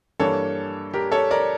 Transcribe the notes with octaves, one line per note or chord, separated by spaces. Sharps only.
G2 E3 A#3 D4 A4 C#5
G4 A#4
A4 C#5
A#4 D5